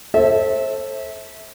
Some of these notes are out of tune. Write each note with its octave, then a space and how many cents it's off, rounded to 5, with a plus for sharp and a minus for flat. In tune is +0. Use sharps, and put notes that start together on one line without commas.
A4 +0 C5 +35 E5 -25